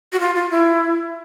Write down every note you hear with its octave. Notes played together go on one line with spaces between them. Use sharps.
F#4
F4
F4
E4